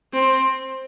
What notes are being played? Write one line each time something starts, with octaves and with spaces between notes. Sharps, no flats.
C4